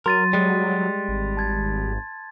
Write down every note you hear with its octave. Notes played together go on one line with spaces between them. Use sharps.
F#3 A#4 C6 A6 D#7
G3 G#3
G#1
A5 G#6 A6